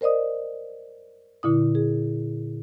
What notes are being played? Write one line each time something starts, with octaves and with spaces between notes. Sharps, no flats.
A#4 C5 D5 D#5 D#6
A#2 D3 E4 D#6
G#4